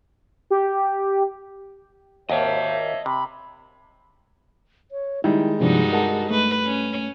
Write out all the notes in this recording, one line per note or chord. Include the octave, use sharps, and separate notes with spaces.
G4
D#2 A#3 C5 C#5 D#5 E5 A5
C3 B5
C#5
D#3 G3 G#3 E4
G2 C3 F3 D4 D#4 F#4
A#4 F#5 A5
A3 B4
C#4